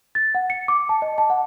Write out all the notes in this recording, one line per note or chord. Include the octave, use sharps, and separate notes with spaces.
A6
F#5
C#7
D6
A5
D#5
A5
F#5